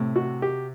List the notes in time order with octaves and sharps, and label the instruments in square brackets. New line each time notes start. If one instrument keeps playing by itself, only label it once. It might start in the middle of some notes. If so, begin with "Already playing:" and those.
Already playing: [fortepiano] A2 [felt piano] C3
[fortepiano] F#4
G4